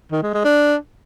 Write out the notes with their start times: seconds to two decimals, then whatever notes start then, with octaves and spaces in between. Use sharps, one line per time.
0.12 D#3
0.23 G#3
0.34 G#3
0.45 D4